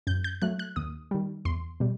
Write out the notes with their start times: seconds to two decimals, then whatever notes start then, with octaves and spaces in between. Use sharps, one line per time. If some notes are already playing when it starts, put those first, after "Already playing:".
0.07 F#2 G6
0.24 G6
0.42 F#3 A3 F#6
0.59 F#6
0.76 D#2 D#6
1.11 D#3 G3
1.45 E2 C6
1.80 B2 G3